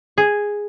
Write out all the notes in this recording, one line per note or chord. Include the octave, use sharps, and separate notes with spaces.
G#4